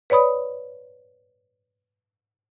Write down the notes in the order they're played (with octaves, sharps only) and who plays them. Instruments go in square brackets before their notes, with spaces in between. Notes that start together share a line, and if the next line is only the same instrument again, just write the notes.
[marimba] B4 C#5 D5 B5 D#6